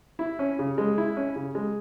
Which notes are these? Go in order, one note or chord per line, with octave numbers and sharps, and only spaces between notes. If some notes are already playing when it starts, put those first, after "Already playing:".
E4
C#4
C#3
G#3
E4
C#4
C#3
G#3